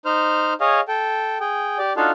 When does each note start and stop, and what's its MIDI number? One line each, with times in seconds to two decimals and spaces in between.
0.05 0.54 63
0.05 0.54 72
0.05 0.54 89
0.61 0.81 68
0.61 0.81 73
0.61 0.81 75
0.61 0.81 77
0.88 1.38 69
0.88 1.38 79
1.40 1.78 68
1.40 1.78 79
1.78 1.93 67
1.78 1.93 74
1.97 2.11 62
1.97 2.11 63
1.97 2.11 65
1.97 2.11 66
1.97 2.11 69
1.97 2.11 77